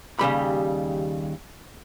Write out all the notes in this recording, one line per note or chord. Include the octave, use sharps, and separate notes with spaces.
D#2 C#3 G3 B5